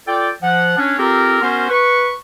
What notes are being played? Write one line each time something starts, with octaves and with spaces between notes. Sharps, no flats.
F4 A4 D5 G5
F3 F#5
C#4 D4 C#5
C4 F4 G4 A4 A#4
B3 C#4 F#4 A#4 C5
B4 C#6